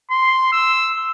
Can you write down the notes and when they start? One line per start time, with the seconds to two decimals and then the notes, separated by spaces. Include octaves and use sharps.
0.11 C6
0.52 E6